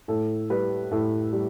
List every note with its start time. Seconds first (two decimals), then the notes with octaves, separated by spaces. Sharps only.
0.08 A2 A4
0.50 G3 B4
0.91 A2 A4
1.33 G3